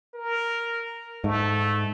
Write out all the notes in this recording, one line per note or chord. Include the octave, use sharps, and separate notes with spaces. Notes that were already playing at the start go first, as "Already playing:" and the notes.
A#4
G#2 A3